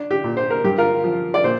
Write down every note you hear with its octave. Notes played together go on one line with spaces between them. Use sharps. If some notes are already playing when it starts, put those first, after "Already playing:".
Already playing: D4
G4
A#2
C5
A#4
G2 G4
F4 A#4
F3
D5
A#2 C5